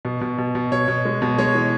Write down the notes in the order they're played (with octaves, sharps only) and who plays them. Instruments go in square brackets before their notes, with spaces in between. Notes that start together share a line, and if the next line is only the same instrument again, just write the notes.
[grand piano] B2
B2
B2
B2
B2 C#5
B2
G#3
B2
G#3 C#5
E3